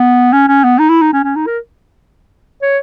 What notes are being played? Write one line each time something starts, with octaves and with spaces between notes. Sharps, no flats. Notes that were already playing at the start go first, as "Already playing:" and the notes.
Already playing: B3
C#4
C#4
B3
D#4
E4
D#4
C#4
C#4
D#4
A#4
C#5